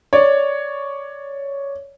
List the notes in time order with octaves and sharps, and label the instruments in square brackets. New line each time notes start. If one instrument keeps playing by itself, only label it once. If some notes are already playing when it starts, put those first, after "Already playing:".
[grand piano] C#5 D5